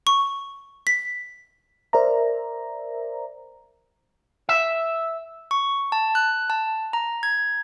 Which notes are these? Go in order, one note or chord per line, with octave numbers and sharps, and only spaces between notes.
C#6
B6
A#4 C5 D5 E5 A#5
E5
C#6
A5
F#6
A5
A#5
G#6